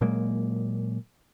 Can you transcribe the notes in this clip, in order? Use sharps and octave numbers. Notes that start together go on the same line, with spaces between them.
A#2 F#3 G#3 A#3